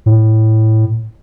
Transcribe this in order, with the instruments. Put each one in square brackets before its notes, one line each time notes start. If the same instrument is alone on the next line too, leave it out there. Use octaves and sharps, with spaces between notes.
[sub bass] A2